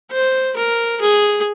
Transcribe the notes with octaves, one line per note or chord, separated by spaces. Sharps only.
C5
A#4
G#4